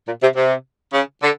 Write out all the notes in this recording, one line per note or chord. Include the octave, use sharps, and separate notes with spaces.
A#2
C3
C3
C#3
D3